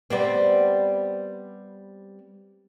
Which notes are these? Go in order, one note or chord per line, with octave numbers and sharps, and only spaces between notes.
G3 B3 C4